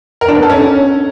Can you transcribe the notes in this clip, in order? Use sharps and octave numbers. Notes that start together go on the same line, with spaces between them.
A#4
D4
B3
A4
C#4